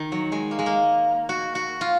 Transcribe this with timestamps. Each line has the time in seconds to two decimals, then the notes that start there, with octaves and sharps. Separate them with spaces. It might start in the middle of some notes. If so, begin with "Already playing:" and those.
Already playing: D#3
0.12 F#3
0.32 G#3
0.51 A#3
0.59 G#3
0.66 A#3
1.29 F#4
1.55 F#4
1.81 F4